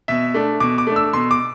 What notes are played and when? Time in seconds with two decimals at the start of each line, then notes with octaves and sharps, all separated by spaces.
0.08 B2 E5
0.34 A3 D4
0.60 B2 D6
0.78 D6
0.87 A3 D4
0.96 E6
1.13 B2 C6
1.31 D6